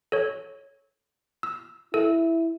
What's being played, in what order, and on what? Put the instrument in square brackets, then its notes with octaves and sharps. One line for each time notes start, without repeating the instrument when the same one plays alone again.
[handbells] A4 C#5
E6
[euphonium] E4 [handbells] A4